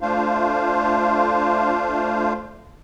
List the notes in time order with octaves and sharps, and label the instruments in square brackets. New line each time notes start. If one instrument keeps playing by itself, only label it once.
[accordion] A3 D4 F4 C5 F5